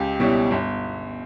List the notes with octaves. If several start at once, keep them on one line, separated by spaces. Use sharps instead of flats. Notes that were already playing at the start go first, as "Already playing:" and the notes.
Already playing: C#2 G4
B2 G3 C#4 E4
G1